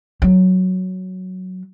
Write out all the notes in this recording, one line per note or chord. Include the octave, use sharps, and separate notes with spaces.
F#3